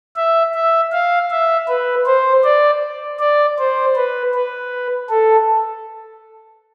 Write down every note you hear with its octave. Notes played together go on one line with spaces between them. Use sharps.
E5
E5
F5
E5
B4
C5
D5
D5
C5
B4
B4
A4